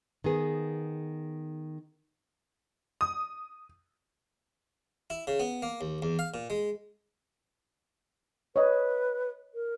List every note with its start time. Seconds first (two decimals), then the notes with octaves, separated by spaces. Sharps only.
0.24 D#3 B3 G#4
3.01 D#6
5.10 E4
5.27 C#3
5.40 B3
5.62 A#3
5.81 D#2
6.02 E2
6.19 F5
6.34 A#2
6.50 G#3
8.56 B4 C#5 D#5
9.54 A#4